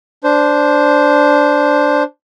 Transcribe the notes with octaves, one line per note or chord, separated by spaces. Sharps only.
D4 C5